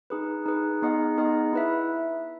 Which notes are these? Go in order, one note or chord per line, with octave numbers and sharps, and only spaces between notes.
D#4 G#4 B4
D#4 G#4 B4
B3 D#4 G#4 D#5 F#5
B3 D#4 G#4 D#5 F#5
E4 B4 E5